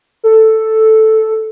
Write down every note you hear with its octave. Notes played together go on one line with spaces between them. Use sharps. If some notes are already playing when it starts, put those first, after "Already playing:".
A4